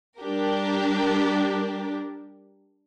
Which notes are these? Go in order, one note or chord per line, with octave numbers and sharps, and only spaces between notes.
G3 D4 G4 A#4